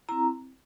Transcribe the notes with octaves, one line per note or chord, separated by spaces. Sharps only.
C4 E4 A#5